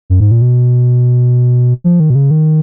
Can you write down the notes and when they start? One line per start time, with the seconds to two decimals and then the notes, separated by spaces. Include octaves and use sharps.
0.10 F#2
0.20 G#2
0.31 A#2
0.42 B2
1.84 F3
2.00 D#3
2.10 B2
2.15 C#3
2.31 D#3